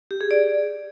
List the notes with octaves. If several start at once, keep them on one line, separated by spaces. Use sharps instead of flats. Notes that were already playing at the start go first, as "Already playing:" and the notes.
G4
G#4
D5